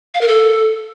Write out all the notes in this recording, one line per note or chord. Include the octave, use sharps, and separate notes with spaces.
F5
A#4
A4